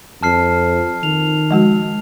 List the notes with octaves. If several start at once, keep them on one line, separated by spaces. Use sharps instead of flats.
F2 A5 F6 C7
D#3 F7
F3 G#3 F#4